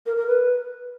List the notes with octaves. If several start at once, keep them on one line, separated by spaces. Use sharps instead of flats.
A#4
A#4
B4